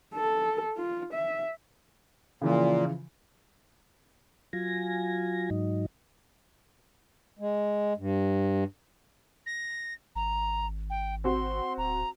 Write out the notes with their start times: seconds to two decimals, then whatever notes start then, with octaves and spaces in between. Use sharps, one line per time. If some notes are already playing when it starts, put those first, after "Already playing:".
0.14 A4
0.77 F4
1.13 E5
2.42 A#2 C#3 E3 F3
4.53 F#3 F4 G#5 A#6
5.51 G#2 F#3 D#4
7.39 G#3
7.97 G2
9.46 A#6
10.16 G#1 A#5
10.90 G5
11.24 C4 F#4 C6
11.78 D1 A#5